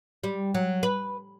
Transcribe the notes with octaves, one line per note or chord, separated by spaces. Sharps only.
G3
F#3
B4